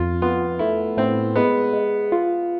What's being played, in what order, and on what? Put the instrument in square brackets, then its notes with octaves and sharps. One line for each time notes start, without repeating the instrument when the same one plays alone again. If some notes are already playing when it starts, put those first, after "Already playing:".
Already playing: [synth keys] F2 [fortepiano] F4
[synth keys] B3 [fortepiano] F4
[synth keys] A3 [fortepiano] E4
[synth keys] A2 [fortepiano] C4
[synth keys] G#3 [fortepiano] B3
[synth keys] G#3
F4